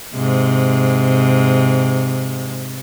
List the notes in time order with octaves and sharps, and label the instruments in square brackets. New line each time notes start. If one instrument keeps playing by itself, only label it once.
[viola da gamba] G#2 C3